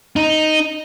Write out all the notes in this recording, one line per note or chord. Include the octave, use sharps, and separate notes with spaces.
D#4